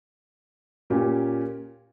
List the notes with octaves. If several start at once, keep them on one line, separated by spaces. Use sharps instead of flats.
A#2 A#3 C#4 G4 A#4